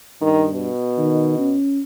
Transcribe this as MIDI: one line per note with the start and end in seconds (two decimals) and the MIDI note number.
0.21 0.68 43
0.21 0.46 51
0.54 1.57 47
0.98 1.35 51
1.39 1.82 61